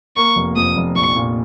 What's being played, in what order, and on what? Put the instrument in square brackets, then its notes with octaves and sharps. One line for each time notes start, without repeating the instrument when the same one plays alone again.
[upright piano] A#3 [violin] C#6
[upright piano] F1
[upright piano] F2 [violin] D#6
[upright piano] F1
[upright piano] A#1 [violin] C#6
[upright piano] A#2